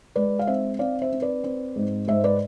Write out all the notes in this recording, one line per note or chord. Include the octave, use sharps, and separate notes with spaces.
G#3 B4 D5
F5
C4 C5 E5
C4 D5 F5
C5 E5
C4
B4 D5
C4
G#2
G#2 C5 E5
B4 D5